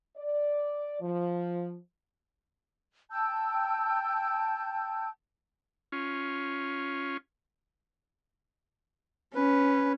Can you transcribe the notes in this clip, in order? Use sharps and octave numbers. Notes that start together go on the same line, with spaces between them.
D5
F3
G5 A5 E6 G6
C#4 F4
C#4 B4